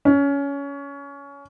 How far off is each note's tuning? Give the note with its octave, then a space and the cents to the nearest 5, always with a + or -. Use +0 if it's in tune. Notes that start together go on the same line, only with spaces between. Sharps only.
C#4 +20